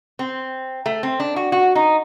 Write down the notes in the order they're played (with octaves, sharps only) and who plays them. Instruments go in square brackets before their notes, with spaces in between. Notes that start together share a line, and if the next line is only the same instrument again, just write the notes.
[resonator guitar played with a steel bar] C4
A3
C4
D4
F#4
F#4
D#4